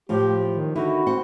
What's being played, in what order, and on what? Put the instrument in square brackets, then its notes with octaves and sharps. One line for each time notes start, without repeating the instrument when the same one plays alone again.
[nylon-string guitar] A2 F3 F4 [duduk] G4
[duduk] D#3
[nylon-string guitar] D3 D#4 E4 [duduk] F#4
[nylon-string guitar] C4 F#5